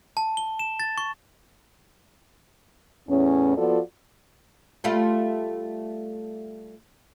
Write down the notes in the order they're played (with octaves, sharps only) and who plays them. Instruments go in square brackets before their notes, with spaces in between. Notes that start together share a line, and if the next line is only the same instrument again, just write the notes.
[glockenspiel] A5
G7
E7
A6
C#6
[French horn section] E2 A2 B3 C#4
F3 B3 F4 F#4 A4 D5
[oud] G3 A3 F4